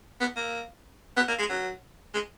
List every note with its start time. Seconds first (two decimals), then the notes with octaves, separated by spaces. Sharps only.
0.20 B3
0.36 A#3
1.17 B3
1.28 A#3
1.39 G#3
1.49 F#3
2.14 G#3